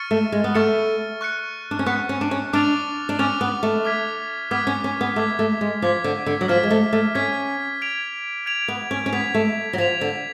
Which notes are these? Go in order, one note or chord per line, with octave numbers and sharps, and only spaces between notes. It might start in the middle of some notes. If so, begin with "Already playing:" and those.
Already playing: C#6 F6 A6 C#7
A3
G#3
B3
A3 C#6 F6 A6 C#7
C#6 F#6 C#7
D4
C#4
B3 C#6 F#6 C#7
C#4
D4
C#4
D4 D6 F6 A6 F7
D4
C#4 D6 F6 A6 F7
B3
A3
D6 F6 G#6 B6
B3 D6 F6 G#6 B6
C#4
C#4
B3
A3 D6 G#6 B6
A3
G#3
F3 D6 G#6 B6
D3
D3
F#3
F3 F6 G#6 B6
G#3
A3
A3
C#4 F6 G#6 B6
G#6 D7 F7
G#6 D7 F7
B3
C#4
C#4
B3 G#6 B6 F7
A3
F#3
F3 G#6 B6 F7
D3